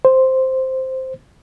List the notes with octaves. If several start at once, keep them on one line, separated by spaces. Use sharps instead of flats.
C5